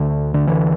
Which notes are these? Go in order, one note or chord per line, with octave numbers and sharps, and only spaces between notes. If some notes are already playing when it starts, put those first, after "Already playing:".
Already playing: D2 D3
D3
D2 D3 E3